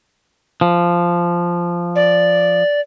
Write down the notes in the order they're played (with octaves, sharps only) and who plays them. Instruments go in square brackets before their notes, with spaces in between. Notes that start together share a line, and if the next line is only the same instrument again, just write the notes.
[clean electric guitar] F3
[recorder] D5